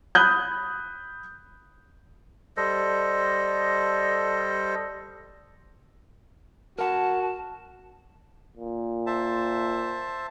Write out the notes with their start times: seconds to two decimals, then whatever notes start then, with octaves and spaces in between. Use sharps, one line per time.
0.15 B5 D#6 F#6 G6
2.57 G3 A4 C5 D#5
6.78 F#4 A#4 F#5 A5
8.57 A#2
9.06 C5 E5 A5